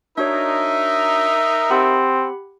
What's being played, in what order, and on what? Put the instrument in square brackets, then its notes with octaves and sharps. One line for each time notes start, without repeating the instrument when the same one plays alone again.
[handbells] D4 F#4 C#5 [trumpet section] D#4 A#4 [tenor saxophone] E5
[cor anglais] C4 [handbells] G4 F#5 B5